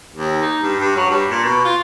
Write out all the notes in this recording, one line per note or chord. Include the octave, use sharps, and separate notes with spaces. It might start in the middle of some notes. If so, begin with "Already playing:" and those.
D#2
D#4
G2
G2
F#3
G2
A#2
B2
F4